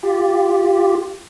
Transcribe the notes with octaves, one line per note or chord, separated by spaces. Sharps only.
F4 G4